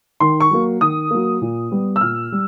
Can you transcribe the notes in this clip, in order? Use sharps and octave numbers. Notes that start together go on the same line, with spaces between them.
D#3 C6
C#6
F#3 A#3
D#3 D#6
F#3 A#3
A#2
G3 B3
E6
A#2 F6
G3